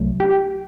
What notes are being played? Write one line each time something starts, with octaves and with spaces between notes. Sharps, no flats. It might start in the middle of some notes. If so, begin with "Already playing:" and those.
Already playing: C2 F#3 A3
G4